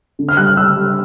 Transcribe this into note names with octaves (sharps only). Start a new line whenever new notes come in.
D3
F6
G3 F#6
F6
G3 E6
G3